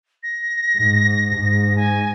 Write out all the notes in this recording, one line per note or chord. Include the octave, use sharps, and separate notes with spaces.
A#6
G#2
G#2
G#5